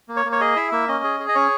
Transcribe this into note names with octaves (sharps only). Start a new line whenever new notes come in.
A#3
C#5
A#3
C#5
G#4 D#5
E4 E5
A#3 E5
C#4 D#5
G#4
G#4
D#5
C#4 C#5